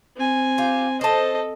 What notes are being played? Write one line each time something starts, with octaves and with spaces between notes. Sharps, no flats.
C4 G#5
F4 G4
A4 C5 D#5 A5